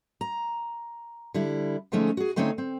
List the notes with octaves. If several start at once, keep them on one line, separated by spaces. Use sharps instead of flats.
A#5
D3 G3 E4
D3 F3 G#3 A3 C#4 D#4
F#4 G#4
D3 A3 C4 C#4 D#4 C#5
C4